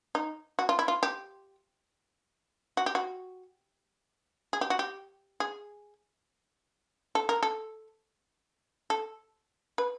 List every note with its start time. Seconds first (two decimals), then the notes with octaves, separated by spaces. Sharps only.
0.15 D#4
0.59 F#4
0.69 F4
0.79 E4
0.88 F4
1.03 G4
2.77 F#4
2.86 G4
2.95 F#4
4.53 G#4
4.61 G4
4.70 F#4
4.79 G4
5.40 G#4
7.15 A4
7.29 A#4
7.43 A4
8.90 A4
9.78 B4